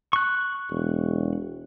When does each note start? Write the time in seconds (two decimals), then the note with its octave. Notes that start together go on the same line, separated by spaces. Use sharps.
0.13 C#6 F#6
0.71 E1